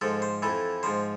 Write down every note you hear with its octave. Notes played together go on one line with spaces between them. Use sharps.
G#2 F3 A4
C5
F2 E3 A4
G#2 F3 C5